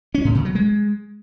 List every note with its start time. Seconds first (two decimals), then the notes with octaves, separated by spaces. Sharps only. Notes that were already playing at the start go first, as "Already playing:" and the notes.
0.15 C#4
0.25 A2
0.35 A#2
0.45 F#3
0.55 G#3